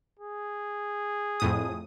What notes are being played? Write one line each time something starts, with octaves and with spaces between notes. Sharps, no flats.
G#4
F2 A2 D#6